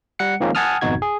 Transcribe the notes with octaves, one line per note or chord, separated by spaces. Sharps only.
G3 F#5 C#7
D#3 F3 G#3 A#3 C4 C#4
F#5 G#5 A5 D#6 F6
G#1 F2 B2 D#4 F#4 G#6
G#4